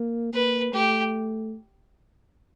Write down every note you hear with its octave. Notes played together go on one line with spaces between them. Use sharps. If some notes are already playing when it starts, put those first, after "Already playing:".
Already playing: A#3
A#3 B4
A3 G4